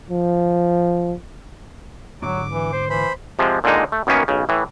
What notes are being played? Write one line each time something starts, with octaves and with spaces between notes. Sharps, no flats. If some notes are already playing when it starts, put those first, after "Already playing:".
F3
G#2 D3 F#3 D4 D6
E3
C5
E3 C5 B5
C3 F3 G#3
A#2 D3 D#3 G#3 D#4
A3
F#2 D#3 A#3 B3 C#4
B1 C#3
A2 E3